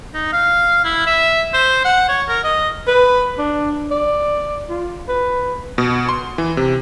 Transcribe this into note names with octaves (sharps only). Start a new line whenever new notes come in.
D#4
F5
E4
E5
C5
F#5
C#5
A#4
D#5
B4
D4
D5
F4
B4
B2
C6
E3
C3